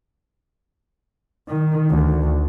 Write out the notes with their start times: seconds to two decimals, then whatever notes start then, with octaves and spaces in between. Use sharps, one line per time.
1.48 D#3
1.90 D2